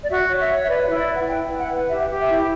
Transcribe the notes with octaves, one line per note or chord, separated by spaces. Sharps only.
D5
F#4 E5
C#5
E5
C#5
E5
B4 D5
D5
E4
D5
B4
F#5
E4 G5
E4
F#5
B4
G4 E5
G4
E5
E4